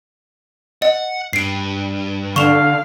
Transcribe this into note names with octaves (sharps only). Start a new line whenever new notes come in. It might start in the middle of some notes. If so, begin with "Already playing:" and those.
D#5 F#5
G2 C7 D7
D3 F5 C#6 E7 F7